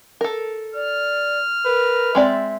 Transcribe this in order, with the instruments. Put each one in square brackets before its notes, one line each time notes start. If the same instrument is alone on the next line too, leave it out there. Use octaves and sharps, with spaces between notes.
[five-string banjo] A4 A#4
[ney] D5 [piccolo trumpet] F6
[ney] A#4 [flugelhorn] B4
[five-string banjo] G#3 C4 D5 [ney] E5